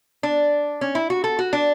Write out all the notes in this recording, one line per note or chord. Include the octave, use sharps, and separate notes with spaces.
D4
C#4
E4
F#4
A4
F#4
D4